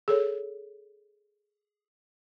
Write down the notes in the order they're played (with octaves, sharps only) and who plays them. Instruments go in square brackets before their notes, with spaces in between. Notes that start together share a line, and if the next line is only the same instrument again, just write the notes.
[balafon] G#4 A4 C#5